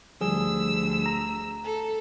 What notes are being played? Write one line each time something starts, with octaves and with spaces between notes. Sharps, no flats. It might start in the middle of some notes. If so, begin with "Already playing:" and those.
D2 F3 G3 G#4 E6
A#5
A4